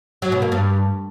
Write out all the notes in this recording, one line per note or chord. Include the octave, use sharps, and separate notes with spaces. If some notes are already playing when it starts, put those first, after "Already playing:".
F#3
B2
A#3
G2